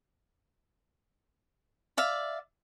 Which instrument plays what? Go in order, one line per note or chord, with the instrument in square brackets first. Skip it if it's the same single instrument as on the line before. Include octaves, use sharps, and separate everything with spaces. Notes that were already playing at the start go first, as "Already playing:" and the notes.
[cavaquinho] D5 E5 F5